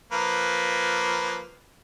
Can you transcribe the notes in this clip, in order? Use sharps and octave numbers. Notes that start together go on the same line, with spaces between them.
F3 A#3 B4